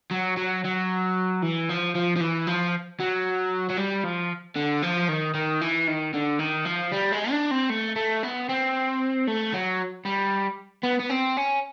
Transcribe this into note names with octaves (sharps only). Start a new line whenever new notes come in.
F#3
F#3
F#3
E3
F3
F3
F3
E3
F3
F#3
F#3
G3
F3
D3
F3
D#3
D#3
E3
D#3
D3
D#3
F3
G3
G#3
D4
C4
A3
A3
B3
C4
A3
F#3
G3
B3
B3
C4
C#4